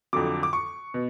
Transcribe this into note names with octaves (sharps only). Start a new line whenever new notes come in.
F2 D3 F#3 D6
D6
C#6
B2